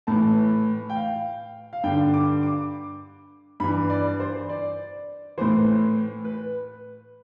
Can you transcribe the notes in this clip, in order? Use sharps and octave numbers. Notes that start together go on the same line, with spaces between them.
A2 E3 A5
G5
F5
F5
G2 D3 G5
D6
D6
G2 E3 B5
D5
C5
D5
A2 E3 C5
B4